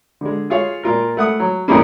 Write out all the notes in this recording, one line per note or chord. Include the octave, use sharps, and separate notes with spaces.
D3 G#3
F4 G#4 C#5 F5
A#2 F4 A#4
A3 F#5 D#6
F#3
F2 A#2 E3 G#3 A#3 C#4